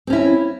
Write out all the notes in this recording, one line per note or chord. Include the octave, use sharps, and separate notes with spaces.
C4 C#4 E4